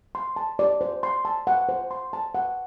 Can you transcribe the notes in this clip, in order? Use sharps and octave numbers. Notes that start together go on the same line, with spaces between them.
C6
A5
D5
C5
C6
A5
F#5
C5
C6
A5
F#5